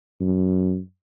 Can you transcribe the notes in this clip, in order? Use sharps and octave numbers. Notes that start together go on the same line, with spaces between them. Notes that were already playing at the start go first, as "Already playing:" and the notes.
F#2